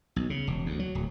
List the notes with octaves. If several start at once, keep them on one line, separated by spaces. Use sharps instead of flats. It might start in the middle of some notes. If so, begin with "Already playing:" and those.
B1
C#3
E1
D2
F#3
D1